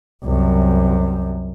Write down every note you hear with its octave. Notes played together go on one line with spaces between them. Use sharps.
C2 F#2